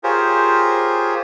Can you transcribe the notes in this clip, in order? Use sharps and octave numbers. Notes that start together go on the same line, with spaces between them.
F4 G4 G#4 A#4 C5 C#5